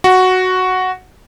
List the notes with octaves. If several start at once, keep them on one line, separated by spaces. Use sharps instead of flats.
F#4